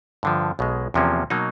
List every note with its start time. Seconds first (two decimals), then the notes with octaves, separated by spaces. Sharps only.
0.23 G2 D3 F3
0.59 B1 B2 G#3
0.94 E2 C3 F3 A#3 C#4
1.30 B2 F#3 A#3 D#4